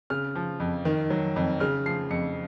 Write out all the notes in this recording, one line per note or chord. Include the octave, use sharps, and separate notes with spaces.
C#3 F6
F3
F2
D#3
F#3
F2
C#3 F6
F3 C7
F2 C#7